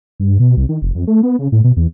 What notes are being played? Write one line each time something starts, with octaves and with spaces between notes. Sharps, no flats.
G2
B2
C2
D#3
F1
F2
A3
B3
C#3
A2
B2
E2